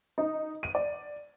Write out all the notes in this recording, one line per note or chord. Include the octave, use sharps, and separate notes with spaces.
D#4
D#7
D5